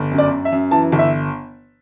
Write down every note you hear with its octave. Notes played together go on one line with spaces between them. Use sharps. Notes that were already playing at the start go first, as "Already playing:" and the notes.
Already playing: G1
F#2
D5
F#2
E5
F#2
E3 A5
G1
E5